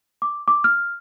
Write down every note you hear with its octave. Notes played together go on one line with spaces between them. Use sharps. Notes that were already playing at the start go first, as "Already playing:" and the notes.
D6
D6
F6